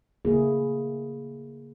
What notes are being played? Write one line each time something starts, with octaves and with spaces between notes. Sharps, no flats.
C#3 A3 A#3 E4 G#4